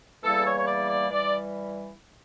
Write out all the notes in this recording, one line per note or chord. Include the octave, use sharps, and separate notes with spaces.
E2 E3 G3 A#3 A4
C#5
C#5
D5
D5
E3 G3 D5